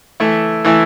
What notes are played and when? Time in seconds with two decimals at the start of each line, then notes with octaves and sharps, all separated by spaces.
0.20 E3 A3 E4
0.65 E3 A3 E4